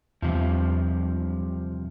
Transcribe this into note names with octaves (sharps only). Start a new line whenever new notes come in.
E2 G2 C3 F3